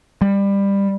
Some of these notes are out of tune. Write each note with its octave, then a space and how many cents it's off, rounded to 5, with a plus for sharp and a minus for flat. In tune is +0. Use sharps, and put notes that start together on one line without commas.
G3 +20